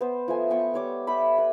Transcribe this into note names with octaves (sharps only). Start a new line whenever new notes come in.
B3 C5
F3 A3 G#5
B3 G5 C#6
G3 C#5 D6
G4 E5 B5
B4